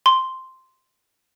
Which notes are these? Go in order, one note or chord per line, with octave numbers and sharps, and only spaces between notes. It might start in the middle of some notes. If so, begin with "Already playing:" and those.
C6